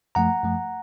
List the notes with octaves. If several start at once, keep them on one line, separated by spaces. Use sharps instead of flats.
F#2 F3 A3 F#5 A#5
F#2 F3 A3